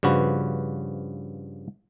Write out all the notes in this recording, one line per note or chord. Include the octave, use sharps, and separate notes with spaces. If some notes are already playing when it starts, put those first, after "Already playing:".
G2 C#3 F3 F#4 B4